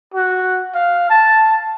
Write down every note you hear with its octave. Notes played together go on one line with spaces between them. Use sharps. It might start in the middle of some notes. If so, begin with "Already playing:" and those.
F#4
F5
A5